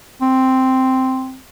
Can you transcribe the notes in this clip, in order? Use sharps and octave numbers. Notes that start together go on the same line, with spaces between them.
C4